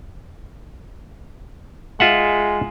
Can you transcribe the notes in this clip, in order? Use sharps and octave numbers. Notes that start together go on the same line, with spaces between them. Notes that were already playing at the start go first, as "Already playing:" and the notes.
G#3 F4 E5 F#5